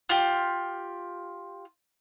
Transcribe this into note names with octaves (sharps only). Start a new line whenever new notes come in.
F4 G4